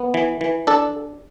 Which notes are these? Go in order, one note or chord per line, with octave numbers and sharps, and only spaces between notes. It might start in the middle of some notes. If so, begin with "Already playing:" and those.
Already playing: B3
E3
E3
D4 A4